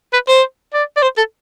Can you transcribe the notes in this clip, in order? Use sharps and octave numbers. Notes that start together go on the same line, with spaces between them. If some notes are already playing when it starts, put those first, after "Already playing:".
B4
C5
D5
D5
C5
A4